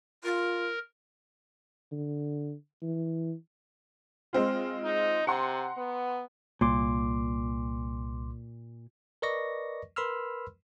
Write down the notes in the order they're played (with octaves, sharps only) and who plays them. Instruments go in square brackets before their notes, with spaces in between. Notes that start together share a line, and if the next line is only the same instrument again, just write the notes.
[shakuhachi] F4 [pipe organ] A#4
[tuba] D3
E3
[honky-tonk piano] G#3 C4 F4
[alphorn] D#4
[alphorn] C3 [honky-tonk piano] F#5 A#5 C6
[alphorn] B3
[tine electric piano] C2 C6 D6 [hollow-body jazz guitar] A#2
[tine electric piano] A#4 B4 D5 D#5 C#6 A#6
A#4 B4 B5 C6 E6 F6